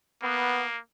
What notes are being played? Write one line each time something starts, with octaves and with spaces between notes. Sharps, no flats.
A#3 B3